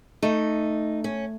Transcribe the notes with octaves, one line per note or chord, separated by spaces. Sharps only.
A3 D#4
C#4